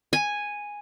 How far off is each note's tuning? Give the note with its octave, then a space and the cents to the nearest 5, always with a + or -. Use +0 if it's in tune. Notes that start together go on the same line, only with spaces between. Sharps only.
G#5 -5